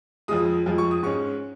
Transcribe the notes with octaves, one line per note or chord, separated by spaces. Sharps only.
F2 F3 G#3 D#6
F2 F3 G#3
C#6
D#6
G#2 G#3 C#4 C#6